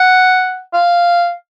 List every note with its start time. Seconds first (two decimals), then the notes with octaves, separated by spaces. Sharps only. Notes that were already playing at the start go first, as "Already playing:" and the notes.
Already playing: F#5
0.74 F5